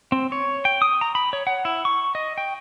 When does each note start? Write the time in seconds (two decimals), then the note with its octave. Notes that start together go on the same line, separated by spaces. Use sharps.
0.12 C4
0.32 C#5
0.65 G5
0.82 D#6
1.01 A#5
1.15 B5
1.33 C#5
1.47 F#5
1.65 E4
1.85 C#6
2.15 D#5
2.38 G5